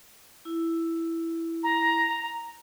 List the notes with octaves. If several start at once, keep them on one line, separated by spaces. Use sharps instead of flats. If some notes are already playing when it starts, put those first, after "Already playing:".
E4
A#5